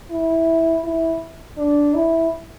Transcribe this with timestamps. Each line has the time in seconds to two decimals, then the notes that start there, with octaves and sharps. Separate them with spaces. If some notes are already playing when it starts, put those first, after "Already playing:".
0.11 E4
0.84 E4
1.58 D4
1.94 E4